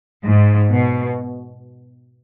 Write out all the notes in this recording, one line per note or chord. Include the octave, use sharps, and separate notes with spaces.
G#2
B2